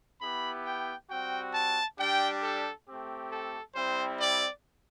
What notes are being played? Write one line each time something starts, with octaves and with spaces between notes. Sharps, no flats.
B3 E4 G4 B5
G5
G3 C4 F#4 G5
A5
G3 D4 G4 G5
A4
A3 C4 G4
A4
G3 C4 E4 C5
D5